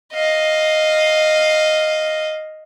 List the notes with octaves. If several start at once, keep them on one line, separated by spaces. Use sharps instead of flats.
D#5 F5